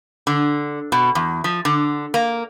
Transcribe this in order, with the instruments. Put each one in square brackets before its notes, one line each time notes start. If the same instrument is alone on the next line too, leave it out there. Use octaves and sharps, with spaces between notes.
[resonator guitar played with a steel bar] D3
B2
E2
F3
D3
A#3